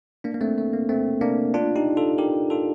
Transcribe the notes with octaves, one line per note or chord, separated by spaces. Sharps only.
A#3 D4
A#3
A3 C4
A3
A#3
A3 C4
A#3 D4
D4 F4
D#4 G4
F4 A4
G4 A#4
F4 A4